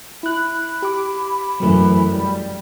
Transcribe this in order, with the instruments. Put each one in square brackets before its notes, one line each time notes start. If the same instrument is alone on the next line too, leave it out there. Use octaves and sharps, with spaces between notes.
[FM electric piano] E4 F#6 [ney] B5
[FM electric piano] G4 D6
[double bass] F#2 E3 [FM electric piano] F#3 A3
[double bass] G3